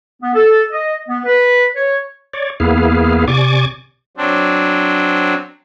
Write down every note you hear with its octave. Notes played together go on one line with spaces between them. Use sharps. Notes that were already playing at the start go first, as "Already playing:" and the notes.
B3
A4
D#5
B3
B4
C#5
C#5 D5
E2 A#3 B3 E4 G#4 F5
C3 D5 G#5 C#6 D6
F#3 C4 D4